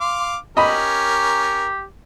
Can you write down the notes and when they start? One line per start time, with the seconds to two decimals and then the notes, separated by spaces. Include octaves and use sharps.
0.01 F5 C6 D6
0.57 C#4 G4 A#4 D#5 B5